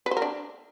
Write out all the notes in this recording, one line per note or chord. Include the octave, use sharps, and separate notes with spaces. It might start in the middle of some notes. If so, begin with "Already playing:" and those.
B4
C5
A#4
D4